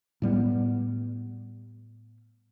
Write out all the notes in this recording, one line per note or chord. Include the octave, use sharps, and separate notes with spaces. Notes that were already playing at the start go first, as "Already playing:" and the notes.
A2 G3 B3